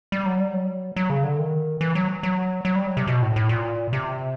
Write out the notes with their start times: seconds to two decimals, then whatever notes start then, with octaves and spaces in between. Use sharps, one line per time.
0.12 G3
0.26 F#3
0.40 G3
0.54 F#3
0.96 F#3
1.10 C#3
1.24 D3
1.39 D#3
1.81 E3
1.95 F#3
2.23 F#3
2.65 F#3
2.75 G3
2.87 F#3
2.97 C3
3.07 B2
3.22 A2
3.36 A2
3.49 A#2
3.93 C3